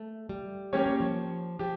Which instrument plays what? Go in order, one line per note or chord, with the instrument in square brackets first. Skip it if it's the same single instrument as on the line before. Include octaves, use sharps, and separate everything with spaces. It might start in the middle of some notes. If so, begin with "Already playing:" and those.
Already playing: [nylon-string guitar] A3
G3
[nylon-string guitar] F3 [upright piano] A#3 C#4 G4 C#5
[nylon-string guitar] G3
F3
[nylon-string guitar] F3 [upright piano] G4